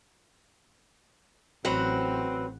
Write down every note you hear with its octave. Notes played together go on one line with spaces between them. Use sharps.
A1 F#3 C4 B4 F#5